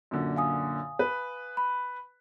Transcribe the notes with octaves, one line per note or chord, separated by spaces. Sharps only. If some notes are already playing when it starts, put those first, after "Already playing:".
F#2 A#2 D3
F5 G#5 D#6
B4
B5